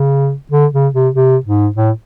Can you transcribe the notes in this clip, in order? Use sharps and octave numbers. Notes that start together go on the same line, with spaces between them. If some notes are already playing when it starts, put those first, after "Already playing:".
Already playing: C#3
D3
C#3
C3
C3
G#2
A2